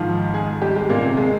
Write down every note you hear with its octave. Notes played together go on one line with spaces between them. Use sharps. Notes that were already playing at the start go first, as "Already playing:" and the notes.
Already playing: G#2 D#3 F3 F4
G#3 G#4
G3 G4
G#3
A#2 A#3
C3 C4
G#3